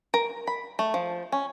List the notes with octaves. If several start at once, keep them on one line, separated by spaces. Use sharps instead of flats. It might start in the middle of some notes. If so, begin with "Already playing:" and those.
A#4
B5
A3
F3
C#4